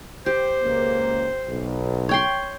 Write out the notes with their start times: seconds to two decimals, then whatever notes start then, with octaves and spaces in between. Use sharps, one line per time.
0.26 G4 C5
0.63 C#2 A#3
1.48 B1
2.09 C#5 G5 C6